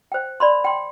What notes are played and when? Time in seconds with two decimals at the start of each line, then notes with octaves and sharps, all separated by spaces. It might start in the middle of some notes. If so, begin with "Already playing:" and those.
0.12 C5 G5
0.40 D5 B5 C6
0.64 G5 C6